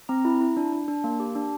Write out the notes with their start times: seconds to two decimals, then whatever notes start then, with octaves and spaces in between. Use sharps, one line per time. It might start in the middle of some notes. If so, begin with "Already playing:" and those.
0.09 C4 A#5
0.25 E4
0.41 E4
0.57 D4
0.72 D4
0.88 D4
1.04 A#3
1.20 G4
1.35 D4